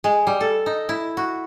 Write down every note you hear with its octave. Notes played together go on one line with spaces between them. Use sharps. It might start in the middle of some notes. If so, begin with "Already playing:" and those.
G#3
G3
A4
D#4
E4
F#4